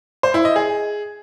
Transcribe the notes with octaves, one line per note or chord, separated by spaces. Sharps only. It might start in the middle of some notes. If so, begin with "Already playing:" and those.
C5
E4
D#5
G#4